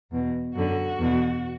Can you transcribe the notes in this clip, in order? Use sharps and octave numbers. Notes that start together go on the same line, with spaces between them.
E2 B2
F#2 D3 F#4
E2 B2